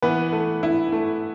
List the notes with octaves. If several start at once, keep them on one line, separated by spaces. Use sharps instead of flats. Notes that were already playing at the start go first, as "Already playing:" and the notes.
E3 B3 B4
A3
E4
A3